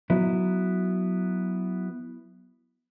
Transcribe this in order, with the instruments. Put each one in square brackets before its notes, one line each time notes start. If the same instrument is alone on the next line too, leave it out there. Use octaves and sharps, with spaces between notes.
[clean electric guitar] F#3 B3 E4